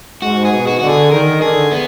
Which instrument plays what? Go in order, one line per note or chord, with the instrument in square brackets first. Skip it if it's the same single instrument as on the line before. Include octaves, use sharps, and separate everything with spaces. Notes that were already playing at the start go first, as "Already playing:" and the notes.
[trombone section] G#2 [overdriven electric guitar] F#4
[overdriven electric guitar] G#4
[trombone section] B2
[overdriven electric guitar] F#4
[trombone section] D3 [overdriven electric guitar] F#4
[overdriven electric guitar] G#4
[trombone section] D#3 [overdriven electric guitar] A#4
[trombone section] D3 [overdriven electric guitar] G#4
[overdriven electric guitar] B3